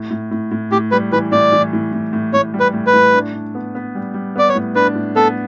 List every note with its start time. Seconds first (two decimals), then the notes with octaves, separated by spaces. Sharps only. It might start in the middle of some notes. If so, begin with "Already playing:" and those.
Already playing: A2
0.10 A2
0.31 A2
0.51 A2
0.71 A2 G4
0.91 G3 B4
1.12 E3 B4
1.32 A2 D5
1.52 E3
1.73 A2
1.93 A2
2.13 A2
2.33 A2 C#5
2.54 G3
2.60 B4
2.73 A2
2.87 B4
2.93 A2
3.14 D4
3.33 D4
3.55 B3
3.75 B3
3.95 G3
4.14 G3
4.36 B3 D5
4.49 C#5
4.55 A2
4.75 D4 B4
4.95 A2
5.16 B3 A4